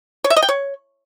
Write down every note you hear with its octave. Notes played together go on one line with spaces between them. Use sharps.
C#5
E5
D#5
G5
C#5